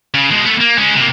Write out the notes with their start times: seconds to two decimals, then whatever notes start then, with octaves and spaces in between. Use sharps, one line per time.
0.14 C#3
0.31 B2 G#3
0.46 A3 B3
0.60 A#3
0.78 G#3 C#4
0.96 C3 A#3